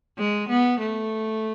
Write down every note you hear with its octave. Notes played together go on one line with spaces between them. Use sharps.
G#3
B3
A3